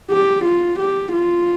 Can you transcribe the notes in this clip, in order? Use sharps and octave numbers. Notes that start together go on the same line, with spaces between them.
G4
F4
G4
F4